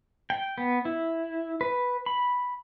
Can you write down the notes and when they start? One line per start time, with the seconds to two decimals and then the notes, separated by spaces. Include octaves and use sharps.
0.30 G5
0.58 B3
0.85 E4
1.61 B4
2.06 B5